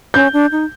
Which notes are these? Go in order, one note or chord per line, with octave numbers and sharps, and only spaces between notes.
C#4 G6
D4
D#4